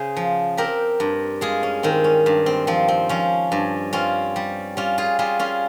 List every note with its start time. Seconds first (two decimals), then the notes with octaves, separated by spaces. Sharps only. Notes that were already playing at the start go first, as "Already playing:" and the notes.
Already playing: C#3 G#4 C5
0.16 F3
0.57 C4 G4 A#4
1.00 G2
1.41 G#3 F4 G#4
1.63 C#4
1.83 D#3 C4
2.04 C#4
2.26 G2
2.46 C4
2.67 F3 C4
2.88 C4
3.09 F3 C#4
3.52 G2
3.93 C4 C#4 F4
4.36 G3
4.77 G3 C#4 F4
4.98 F4 G#4
5.19 G3 F4 G#4
5.39 C#4 F4